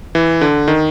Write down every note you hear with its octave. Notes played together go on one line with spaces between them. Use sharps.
E3
D3
D#3